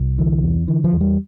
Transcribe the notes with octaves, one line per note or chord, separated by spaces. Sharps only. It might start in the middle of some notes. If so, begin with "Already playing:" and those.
Already playing: C2
D3 E3
E2
D3 E3
F3
E2
G3